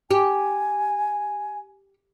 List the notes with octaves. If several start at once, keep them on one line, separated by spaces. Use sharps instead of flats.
G4 G#5